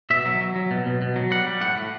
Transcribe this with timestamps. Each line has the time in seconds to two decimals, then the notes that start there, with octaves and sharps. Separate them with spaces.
0.10 B2 E5
0.25 F#3
0.41 F#3
0.56 F#3
0.71 B2
0.86 B2
1.02 B2
1.16 F#3
1.31 G3 F#5
1.47 G3
1.61 A2 F#5
1.76 A2